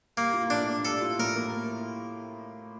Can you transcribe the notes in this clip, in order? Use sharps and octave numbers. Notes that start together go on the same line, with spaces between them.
G3 A#3
F4
A2 D4
A#3
G3 A4
F4
A2 A#4
A#3